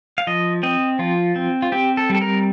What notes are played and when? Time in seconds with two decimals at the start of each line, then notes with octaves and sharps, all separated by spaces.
0.18 F5
0.27 F3 D#5
0.63 C4 D#5
0.99 F3 F4
1.36 C4
1.62 F4
1.72 C4 G4
1.97 A4
2.10 G3 A4
2.21 A#4